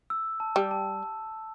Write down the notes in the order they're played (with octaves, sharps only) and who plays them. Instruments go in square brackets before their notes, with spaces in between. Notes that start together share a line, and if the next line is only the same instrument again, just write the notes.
[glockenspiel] E6
A5
[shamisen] G3
[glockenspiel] A5